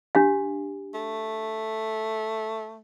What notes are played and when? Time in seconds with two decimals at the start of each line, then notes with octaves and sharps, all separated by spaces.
0.15 D4 G4 F5
0.94 A3